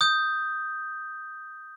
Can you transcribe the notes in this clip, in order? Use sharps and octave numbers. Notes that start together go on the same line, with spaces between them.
D#6 G6